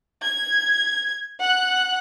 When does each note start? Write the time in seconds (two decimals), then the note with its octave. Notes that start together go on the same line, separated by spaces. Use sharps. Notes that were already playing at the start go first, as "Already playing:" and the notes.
0.23 G#6
1.40 F#5 F#6